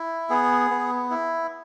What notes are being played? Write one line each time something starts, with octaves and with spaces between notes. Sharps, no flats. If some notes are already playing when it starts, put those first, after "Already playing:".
Already playing: E4
B3 G#4
B3
E4